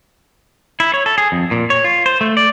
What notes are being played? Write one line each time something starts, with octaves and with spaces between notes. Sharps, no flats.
E4
C#5
A4
G#4
F2
A#2
C#5
F4
C5
A3
D5